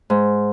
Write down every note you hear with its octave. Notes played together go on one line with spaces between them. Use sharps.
G#2